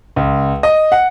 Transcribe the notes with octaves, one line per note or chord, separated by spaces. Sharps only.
C#2
D#5
F#5